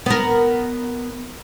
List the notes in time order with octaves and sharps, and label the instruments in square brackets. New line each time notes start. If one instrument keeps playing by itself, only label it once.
[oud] B3 A#4